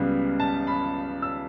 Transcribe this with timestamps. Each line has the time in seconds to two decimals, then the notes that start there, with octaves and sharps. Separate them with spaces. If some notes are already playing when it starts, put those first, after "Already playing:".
Already playing: C#2 C#3 G3 B3
0.40 A5
0.67 B5
1.22 E6